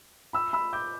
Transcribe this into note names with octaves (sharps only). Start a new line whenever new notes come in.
B5 E6
B5 E6
D6 G6